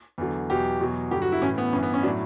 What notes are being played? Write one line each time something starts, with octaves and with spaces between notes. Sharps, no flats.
E2 D3 F#3
E2 B2 F#3 G4
E2 B2 F#3
G2 D3 F#3 G4
F#4
E4
A2 E3 C#4
B3
G2 E3 C#4
B3
C#4
A2 F#3 D4